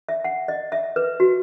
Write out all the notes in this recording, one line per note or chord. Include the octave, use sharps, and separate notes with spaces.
E5
F#5
D#5
E5
B4
F#4